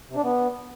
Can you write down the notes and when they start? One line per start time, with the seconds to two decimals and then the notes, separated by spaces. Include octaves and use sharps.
0.09 C3
0.16 D4
0.23 B3